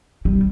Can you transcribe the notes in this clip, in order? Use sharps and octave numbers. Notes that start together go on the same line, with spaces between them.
G3